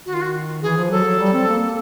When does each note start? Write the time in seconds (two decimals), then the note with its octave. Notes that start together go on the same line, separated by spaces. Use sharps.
0.06 D#3 F#4
0.14 F4
0.21 F#4
0.62 E3 G#4
0.77 F3
0.90 F#3 A4
1.05 F#3
1.19 G3
1.33 C4
1.48 A#3